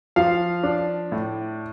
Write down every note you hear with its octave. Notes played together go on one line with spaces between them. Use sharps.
F3 F5
D4
A2